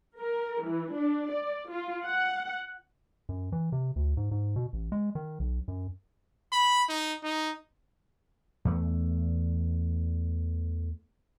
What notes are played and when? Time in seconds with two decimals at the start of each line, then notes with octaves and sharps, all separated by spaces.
0.19 A#4
0.65 E3
0.94 D4
1.31 D5
1.70 F4
2.06 F#5
3.29 F#2
3.52 E3
3.72 C3
3.96 D2
4.17 G#2
4.31 G#2
4.56 B2
4.73 A1
4.92 G#3
5.15 D#3
5.40 B1
5.68 F#2
6.52 B5
6.89 D#4
7.23 D#4
8.65 E2 A3